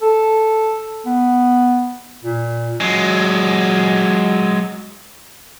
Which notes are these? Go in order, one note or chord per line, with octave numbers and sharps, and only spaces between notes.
A4
B3
A#2
F#3 G#3